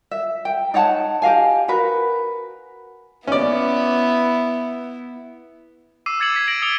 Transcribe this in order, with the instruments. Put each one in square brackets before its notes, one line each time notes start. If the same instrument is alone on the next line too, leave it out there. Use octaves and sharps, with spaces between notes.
[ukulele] E5
G5
D#4 C#5 F#5 A5
G4 D#5 F5 G#5
F#4 A#4 B4
[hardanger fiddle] B3 E4 [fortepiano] C#4 D5
[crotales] D6 E6 C7 D#7
E6 G#6 A6 C#7 D#7 F#7
G#6 B6
A#6 D7 D#7 F#7
D#6 C#7 D7 G7